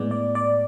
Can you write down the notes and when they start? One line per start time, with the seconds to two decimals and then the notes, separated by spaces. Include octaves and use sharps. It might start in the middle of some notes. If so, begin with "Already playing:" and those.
Already playing: A2 G#3 B3 D5
0.11 D5
0.35 D5